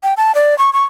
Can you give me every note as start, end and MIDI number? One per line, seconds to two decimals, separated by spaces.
0.03 0.14 79
0.17 0.35 81
0.35 0.57 74
0.59 0.73 85
0.73 0.84 85